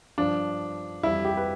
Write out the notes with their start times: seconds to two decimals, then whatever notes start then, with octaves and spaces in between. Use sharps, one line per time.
0.18 G2 F3 D4
1.03 F2 E3 G3 E4
1.25 G4
1.37 B4